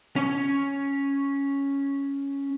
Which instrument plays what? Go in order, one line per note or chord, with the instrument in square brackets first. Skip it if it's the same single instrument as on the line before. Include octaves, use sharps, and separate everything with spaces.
[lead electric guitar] C#4 C#5